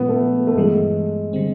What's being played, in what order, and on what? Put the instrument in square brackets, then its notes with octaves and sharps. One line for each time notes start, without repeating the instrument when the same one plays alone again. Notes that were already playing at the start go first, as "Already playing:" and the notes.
Already playing: [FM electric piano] A#2 F3 G#3 C#4 F4 [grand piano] B3
[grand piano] A3
A3
[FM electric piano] G2 E3 G3 [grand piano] G#3
[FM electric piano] D3 G3 C4